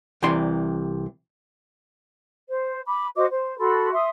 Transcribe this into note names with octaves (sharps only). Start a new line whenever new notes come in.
C2 C3 E3 D5 C6
C5
B5 D6
F#4 C5 D#5 D6
C5
F#4 A4 B5 C6
E5 C6 D#6